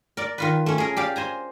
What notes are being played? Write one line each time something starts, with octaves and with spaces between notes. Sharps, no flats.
A#4 D5
D#3 F4 B4
A3 C#4
G#4 A#4
G4 D5 F5
C5 G#5 A#5